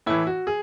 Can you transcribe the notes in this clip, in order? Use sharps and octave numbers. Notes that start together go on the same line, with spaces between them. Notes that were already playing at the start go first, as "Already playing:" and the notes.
A2 E3 E4
F#4
G#4